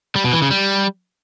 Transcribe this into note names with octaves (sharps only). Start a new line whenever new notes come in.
G3
B2
E3
C#3
G3